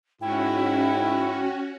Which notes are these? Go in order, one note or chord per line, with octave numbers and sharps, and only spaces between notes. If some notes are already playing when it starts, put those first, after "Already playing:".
G#2 C#4 E4 F#4 G5